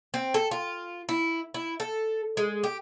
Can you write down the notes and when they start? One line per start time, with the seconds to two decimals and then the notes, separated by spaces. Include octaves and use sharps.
0.14 C4
0.34 A4
0.51 F4
1.09 E4
1.54 E4
1.80 A4
2.37 G#3
2.63 G4